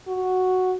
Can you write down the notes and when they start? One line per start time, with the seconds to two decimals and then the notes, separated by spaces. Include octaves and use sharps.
0.08 F#4